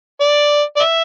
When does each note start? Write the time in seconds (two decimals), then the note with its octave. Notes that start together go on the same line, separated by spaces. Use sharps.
0.20 D5
0.77 D5
0.80 E5